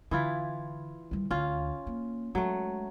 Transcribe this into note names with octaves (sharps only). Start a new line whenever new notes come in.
D3 E3 E4 F4
D#3 G3
D2 C#4 F4
A#3
F#3 G#3 A3